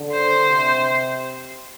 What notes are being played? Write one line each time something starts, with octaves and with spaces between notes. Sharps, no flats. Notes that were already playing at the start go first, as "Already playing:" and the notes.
Already playing: D3
C5
C3